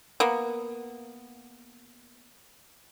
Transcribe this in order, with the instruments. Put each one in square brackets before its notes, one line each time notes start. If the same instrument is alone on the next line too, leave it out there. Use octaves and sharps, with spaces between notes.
[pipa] A#3 B3